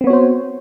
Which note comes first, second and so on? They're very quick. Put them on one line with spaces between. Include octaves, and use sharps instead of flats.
C4 B3 C#5 F#4 C5